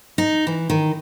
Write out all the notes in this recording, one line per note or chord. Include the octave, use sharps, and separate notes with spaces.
D#4
E3
D#3